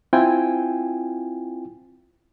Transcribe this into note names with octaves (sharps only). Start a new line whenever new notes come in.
C4 E4 F4 G5 G#5